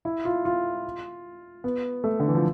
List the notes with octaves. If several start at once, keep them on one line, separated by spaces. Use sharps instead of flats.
E4
F4
F4
B3
A3
D3
E3
F3